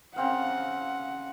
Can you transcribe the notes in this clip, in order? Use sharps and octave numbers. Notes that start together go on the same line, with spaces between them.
C#3 C4 F5 F#5